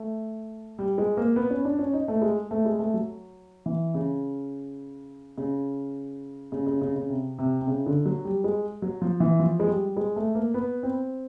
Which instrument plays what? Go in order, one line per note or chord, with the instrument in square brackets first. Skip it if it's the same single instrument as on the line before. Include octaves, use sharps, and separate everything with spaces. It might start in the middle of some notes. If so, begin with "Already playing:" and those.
Already playing: [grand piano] A3
G3
G#3
A#3
B3
C#4
D4
C#4
D#4
A3
G#3
A3
G#3
A3
F#3
E3
C#3
C#3
C#3
C#3
C#3
C#3
C3
C3
C3
C#3
D3
F#3
G3
G#3
F#3
F3
E3
F3
G#3
G3
G#3
A3
A#3
B3
C4